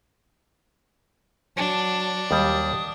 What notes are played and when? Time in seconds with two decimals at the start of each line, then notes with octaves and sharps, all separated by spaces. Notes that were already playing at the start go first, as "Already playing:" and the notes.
1.57 F#3 D4 A5
2.31 D#2 G3 A5 D#6